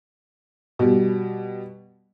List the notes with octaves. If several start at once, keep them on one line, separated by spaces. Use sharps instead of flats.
B2 G3